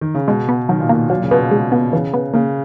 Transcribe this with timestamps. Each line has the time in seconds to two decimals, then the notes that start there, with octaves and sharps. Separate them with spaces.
0.01 D#3
0.15 C#3
0.28 B2 G#3
0.49 B3
0.69 D#3 F#3
0.80 A#2
0.89 B2 A#3
1.10 A#2 F#3
1.22 C#3
1.31 B2 B3
1.51 G#3
1.72 B3
1.93 C#3 E3
2.14 B3
2.34 C#3 A#3